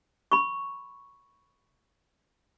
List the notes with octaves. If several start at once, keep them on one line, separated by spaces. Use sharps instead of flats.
B5 C#6